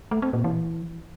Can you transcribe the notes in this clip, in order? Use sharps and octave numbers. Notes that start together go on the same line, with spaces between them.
A3
C4
A#2
E3